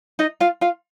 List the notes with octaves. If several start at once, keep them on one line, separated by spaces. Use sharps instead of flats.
D#4 D#5
F4 F5
F4 F5